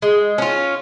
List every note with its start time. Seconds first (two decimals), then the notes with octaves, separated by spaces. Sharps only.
0.02 G#3
0.38 C#4 F4